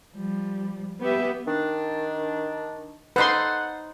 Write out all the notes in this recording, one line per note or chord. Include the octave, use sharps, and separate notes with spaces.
F3 G3
B3 G4 E5
D#3 D4
D#4 A4 B4 C5 F#5 C6